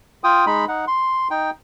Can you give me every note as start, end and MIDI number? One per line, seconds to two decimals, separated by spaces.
0.24 0.45 65
0.24 0.45 79
0.24 0.45 87
0.47 0.65 56
0.47 0.65 63
0.47 0.65 83
0.68 0.85 63
0.68 0.85 78
0.88 1.28 84
1.31 1.50 63
1.31 1.50 79